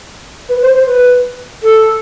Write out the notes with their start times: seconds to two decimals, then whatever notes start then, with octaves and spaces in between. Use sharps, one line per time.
0.49 B4
0.62 C5
0.74 C5
0.86 B4
1.63 A4